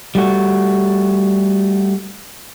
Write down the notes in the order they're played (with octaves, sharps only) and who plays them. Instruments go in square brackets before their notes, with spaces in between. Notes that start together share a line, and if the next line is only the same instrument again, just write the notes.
[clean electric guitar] G3 A3 F#4